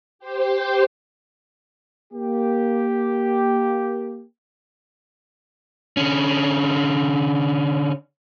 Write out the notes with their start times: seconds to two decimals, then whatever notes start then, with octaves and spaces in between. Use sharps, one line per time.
0.19 G4 C5
2.14 A#3 G4
5.97 D3 C#4